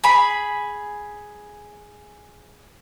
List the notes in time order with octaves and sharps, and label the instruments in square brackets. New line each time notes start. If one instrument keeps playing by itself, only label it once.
[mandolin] G#4 B5